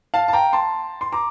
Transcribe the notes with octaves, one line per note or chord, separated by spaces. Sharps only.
F5 A5
A5
G5 A#5
A5 C6
C6
A#5 D6